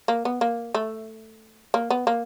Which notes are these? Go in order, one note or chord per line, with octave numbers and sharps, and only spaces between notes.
A#3
B3
A#3
A3
A#3
B3
A#3